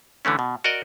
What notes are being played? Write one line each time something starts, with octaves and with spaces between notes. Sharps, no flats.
D3 E3 A3 C#4
B2
F#4 A#4 D5 D#5